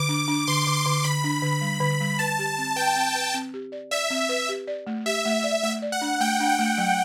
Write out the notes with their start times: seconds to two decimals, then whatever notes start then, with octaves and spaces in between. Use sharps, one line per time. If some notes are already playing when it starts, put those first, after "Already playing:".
Already playing: D3 D6
0.09 D4
0.28 D4
0.47 D3 C6
0.67 D3
0.76 C6
0.86 D3
1.04 D3 B5
1.24 D4
1.43 D3
1.61 G3
1.81 D3
2.01 G3
2.19 B4 A5
2.39 G4
2.58 C4
2.76 B4 G5
2.96 C4
3.15 B4
3.34 C4
3.54 G4
3.72 D5
3.91 D5 E5
4.10 C4
4.29 B4
4.49 G4
4.67 D5
4.87 A3
5.06 G4 E5
5.25 A3
5.44 D5
5.63 A3 E5
5.82 D5
5.92 F#5
6.02 D4
6.20 A3 G5
6.40 D4
6.49 G5
6.59 A3
6.78 F#3